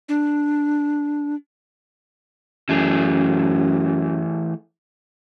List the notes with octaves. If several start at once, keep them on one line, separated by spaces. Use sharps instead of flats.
D4
F#2 E3 A3 G#4